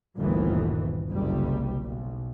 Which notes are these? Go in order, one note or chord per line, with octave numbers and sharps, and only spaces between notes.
G1 D2 A#2 D#3 E3
F#1 C2 G3
B1